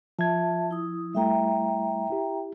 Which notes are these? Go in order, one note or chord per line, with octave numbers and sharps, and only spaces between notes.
F3 F4 E5 A5 G#6
E4 D#6
G3 A3 E4 E5 G5 A#5
E4 G4